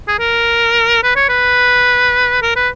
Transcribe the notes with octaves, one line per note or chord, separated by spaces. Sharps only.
G#4
A#4
B4
C#5
B4
A#4
B4